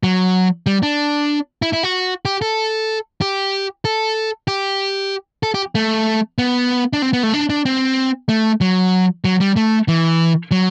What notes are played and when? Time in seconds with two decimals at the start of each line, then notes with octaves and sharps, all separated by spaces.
0.03 F#3
0.66 G3
0.83 D4
1.62 E4
1.73 E4
1.83 F#4
2.25 G4
2.42 A4
3.21 G4
3.85 A4
4.48 G4
5.43 A4
5.54 G4
5.75 A3
6.38 B3
6.93 D4
7.02 C4
7.13 B3
7.23 A3
7.34 D4
7.50 D4
7.65 C4
8.29 A3
8.61 F#3
9.24 F#3
9.40 G3
9.56 A3
9.88 E3
10.51 F#3